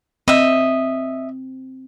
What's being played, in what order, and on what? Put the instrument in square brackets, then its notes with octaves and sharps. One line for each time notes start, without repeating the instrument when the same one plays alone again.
[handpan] C4 [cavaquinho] D#5 E5